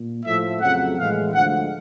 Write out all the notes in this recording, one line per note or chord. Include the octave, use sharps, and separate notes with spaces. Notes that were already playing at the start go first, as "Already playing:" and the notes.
Already playing: A#2
A2 F3 A3 E5
F2 C#3 F#3 A3 F#5
A2 E3 G#3 F5
D2 D3 F3 G#3 F#5